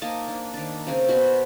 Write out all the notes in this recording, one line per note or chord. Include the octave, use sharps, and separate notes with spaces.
A#3 D#4 D#5 A5
D4
D#3 D4
C#3 C4 C#4
B2 F#4 C5 B5